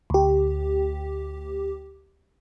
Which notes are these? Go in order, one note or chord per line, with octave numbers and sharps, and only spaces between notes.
D2 G4